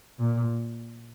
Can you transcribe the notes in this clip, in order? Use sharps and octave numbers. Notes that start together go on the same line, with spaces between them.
A#2